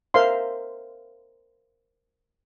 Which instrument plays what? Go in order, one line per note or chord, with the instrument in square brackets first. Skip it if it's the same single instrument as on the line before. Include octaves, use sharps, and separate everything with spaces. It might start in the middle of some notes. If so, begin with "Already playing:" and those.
[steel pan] A#4 C5 E5 F5 C6